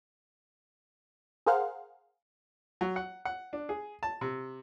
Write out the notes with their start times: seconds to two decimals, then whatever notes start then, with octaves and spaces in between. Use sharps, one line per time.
1.46 G#4 A#4 C5 F5 F#5
2.81 F#3
2.96 F#5
3.25 F#5
3.53 D4
3.69 G#4
4.03 A5
4.21 C3